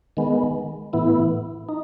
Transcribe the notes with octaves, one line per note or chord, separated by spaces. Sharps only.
D#3 G#3 B3
A2 E3 B3 E4
D#4